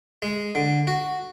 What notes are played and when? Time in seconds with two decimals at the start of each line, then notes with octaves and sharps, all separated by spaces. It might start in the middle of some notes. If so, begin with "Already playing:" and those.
0.22 G#3
0.55 D3
0.87 F#4